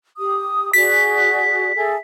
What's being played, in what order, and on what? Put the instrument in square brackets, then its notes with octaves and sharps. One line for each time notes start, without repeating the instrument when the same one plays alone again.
[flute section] G4 D#6
[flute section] F#4 G#4 D5 [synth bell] B6
[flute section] G#4 A4 E5